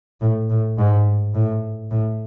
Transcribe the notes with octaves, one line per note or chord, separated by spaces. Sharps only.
A2
A2
G#2
A2
A2